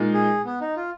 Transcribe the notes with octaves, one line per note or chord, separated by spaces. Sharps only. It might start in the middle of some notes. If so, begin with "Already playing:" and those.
Already playing: A#2 G#3 D#4
G#4
B3
D#4
F4